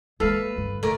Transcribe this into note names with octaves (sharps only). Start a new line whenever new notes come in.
G#3 A#3 A4 B4 E5 F5
D2 G2
A2 A3 A#4 D5